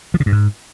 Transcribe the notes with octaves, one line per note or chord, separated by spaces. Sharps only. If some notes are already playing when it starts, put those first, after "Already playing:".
F3
C#3
G2
G#2